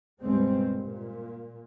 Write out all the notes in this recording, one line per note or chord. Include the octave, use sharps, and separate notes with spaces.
C#2 G2 B2 G3 G#3 C4
A#2